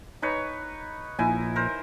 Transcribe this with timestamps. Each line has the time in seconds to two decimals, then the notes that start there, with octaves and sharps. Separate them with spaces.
0.22 D#4 B4 C#5
1.19 A#1 A#2 D#4 E4 G#5
1.56 A#4 C5